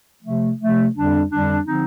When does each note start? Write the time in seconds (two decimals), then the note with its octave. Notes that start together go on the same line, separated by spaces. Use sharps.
0.23 C3 F3 A3
0.59 C3 F3 A3
0.93 F2 D3 G3 D4
1.30 F2 D3 G3 D4
1.65 D3 F3 C4 D#4